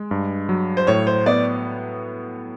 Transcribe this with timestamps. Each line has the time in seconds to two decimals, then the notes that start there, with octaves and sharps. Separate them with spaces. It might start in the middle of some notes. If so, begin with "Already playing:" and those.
Already playing: G#3
0.11 G2
0.49 F#3
0.77 C5
0.87 A2 C#5
1.07 C5
1.26 B3 D5